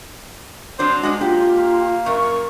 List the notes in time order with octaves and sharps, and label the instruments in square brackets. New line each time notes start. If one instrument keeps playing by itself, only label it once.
[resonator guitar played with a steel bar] F#3 C4 D4 [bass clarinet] C5
[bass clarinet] G#3 [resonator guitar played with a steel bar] C#4 D4 F#4
[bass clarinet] A#3 [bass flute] F4 [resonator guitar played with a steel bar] G4
[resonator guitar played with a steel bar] F#2 A#2 [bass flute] A#4 [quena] C#6